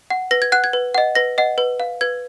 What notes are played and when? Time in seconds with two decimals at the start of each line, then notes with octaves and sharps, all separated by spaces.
0.10 F#5
0.31 B4 A#6
0.42 G#6
0.52 F#5 F#6
0.64 G#6
0.73 B4
0.94 D#5 F#5
1.15 B4 A#6
1.38 D#5 F#5
1.58 B4
1.80 F5
2.01 B4 G#6